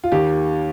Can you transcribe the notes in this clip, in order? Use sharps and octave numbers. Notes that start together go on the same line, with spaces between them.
F4
D#2 D#3 G4